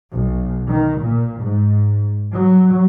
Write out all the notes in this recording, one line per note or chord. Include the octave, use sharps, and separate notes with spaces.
B1
D#3
A#2
G#2
F#3